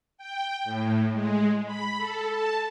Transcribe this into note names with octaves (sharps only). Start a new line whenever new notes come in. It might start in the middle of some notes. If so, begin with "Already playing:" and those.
G5
A2
G#3
B5
A4
A5